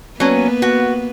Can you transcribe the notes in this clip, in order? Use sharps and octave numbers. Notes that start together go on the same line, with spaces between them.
F#3 A#3 B3 C#4 B4
F#4